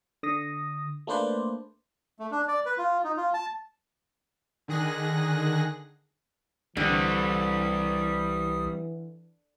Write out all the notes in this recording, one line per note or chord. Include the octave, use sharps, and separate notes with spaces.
D3 D#6 A#6
A3 A#3 D4 B4 C5 D5
A3
D4
D5
B4
F4
D#4
F4
A5
D3 D#3 G#4 F#6 A#6
C2 D3 E3 G3 C4 D#6